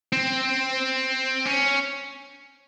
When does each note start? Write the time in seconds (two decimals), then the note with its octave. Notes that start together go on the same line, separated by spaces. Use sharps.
0.12 C4
1.45 C#4